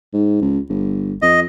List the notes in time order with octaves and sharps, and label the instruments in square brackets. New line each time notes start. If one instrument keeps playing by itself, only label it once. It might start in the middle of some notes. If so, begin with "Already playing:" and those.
[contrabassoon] G#2
C#2
G1
[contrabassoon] F2 [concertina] D#5